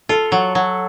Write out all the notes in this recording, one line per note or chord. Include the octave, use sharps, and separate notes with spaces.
F4 A4
F#3
F#3